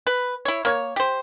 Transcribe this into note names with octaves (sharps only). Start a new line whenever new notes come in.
B4
E4 C#5
A#3 C#5
G4 C5